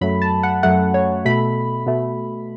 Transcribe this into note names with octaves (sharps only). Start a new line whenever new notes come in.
F#2 F#3 A3 B5
A5
F#5
F#2 F#3 A3 F#5
C#5
B2 A3 B5
B2 A3